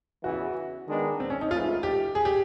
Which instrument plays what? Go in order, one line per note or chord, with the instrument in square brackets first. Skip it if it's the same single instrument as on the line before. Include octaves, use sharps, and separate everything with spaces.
[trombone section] E2 C#3 E3 [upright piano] F#4
[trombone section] D#3 G#3 B3 D4
[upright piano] C4
C#4
D#4
[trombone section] G#2 E3 A3 [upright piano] F4
[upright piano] G4
G#4
G4